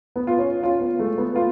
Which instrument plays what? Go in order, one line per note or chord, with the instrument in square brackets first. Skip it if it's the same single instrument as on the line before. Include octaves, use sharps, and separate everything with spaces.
[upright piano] B3
[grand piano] F4
[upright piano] C#4
[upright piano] C#4 [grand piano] F4
[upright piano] B3
[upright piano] G#3 [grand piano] A3
[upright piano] B3
[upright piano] B3 [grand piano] F4